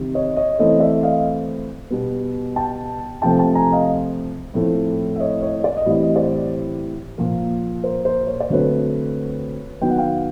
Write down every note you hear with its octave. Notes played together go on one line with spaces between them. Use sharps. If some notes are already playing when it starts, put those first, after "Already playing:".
Already playing: C3 D#3 G3 C4
C#5 D#5
C#5 D#5
E3 A3 C4 C#5 D#5
D5 E5
D#5 F5
B2 G3 B3
G5 A5
C3 F3 A3 C4 G5 A5
G5 A5
G#5 A#5
D#5 F5
A2 F3 A3 C4
E5
C#5 D#5
C#5 D#5
D5
D#5
A2 E3 G3 C4 D5
D#5
C5 D5
A#2 F3 A#3
A#4 C5
A#4 C5
C#5
D5
D3 F#3 A3 C4 B4 C#5
D#3 F#3 B3 G5
F#5
F5 G5